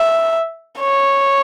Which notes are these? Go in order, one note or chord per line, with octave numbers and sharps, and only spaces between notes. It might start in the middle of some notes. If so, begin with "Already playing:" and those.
Already playing: E5
C#5